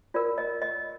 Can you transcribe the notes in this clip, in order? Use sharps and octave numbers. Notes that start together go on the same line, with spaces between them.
F4 A#4 D5
D#5
D#5